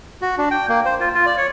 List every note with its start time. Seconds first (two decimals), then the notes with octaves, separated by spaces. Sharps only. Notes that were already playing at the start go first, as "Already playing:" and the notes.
0.22 F#4
0.38 D4
0.51 G5
0.69 A#3
0.85 C5
1.00 F4
1.15 F4
1.26 D5
1.37 C#5